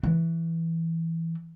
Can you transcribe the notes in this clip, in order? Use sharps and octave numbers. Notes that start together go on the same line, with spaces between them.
E3